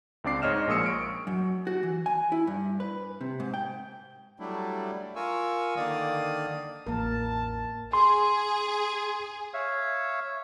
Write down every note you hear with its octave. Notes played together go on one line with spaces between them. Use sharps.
C#2 C4 D4 D5 D6 C7
G#2 C#5 D#5 F6 E7
A#1 G#3 A#3 D#6 E6 C#7
C#6 D7
F#2
F#4
E3
G#5
E4
G2
B4
C3
G#2
G5
F#3 G3 A3 D4 E4
F4 A#4 G#5 C#6 E6
D3 D#3 A#3 D5 F5 D#6
A1 E2 A#3 A#4 A5
G#4 C6
C#5 E5 F5